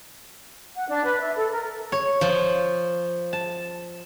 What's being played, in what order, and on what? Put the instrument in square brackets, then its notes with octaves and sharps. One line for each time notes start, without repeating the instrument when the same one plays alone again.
[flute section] F#5
D4
B4
E5
A4
A#4
[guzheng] C#5
F3
A5